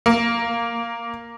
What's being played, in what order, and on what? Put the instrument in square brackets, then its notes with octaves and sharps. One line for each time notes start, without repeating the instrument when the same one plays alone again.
[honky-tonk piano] A#3